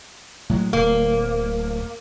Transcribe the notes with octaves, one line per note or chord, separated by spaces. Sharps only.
A2 F#3 G#3
D1 A#3